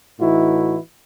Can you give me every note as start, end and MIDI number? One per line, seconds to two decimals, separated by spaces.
0.20 0.77 45
0.20 0.77 52
0.20 0.77 63
0.20 0.77 64
0.20 0.77 66